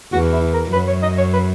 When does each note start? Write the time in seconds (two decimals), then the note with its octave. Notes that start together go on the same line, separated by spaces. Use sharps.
0.13 E2 F#4
0.33 E4
0.53 A#4
0.73 F#2 B4
0.88 C#5
1.03 D#5
1.18 C#5
1.33 B4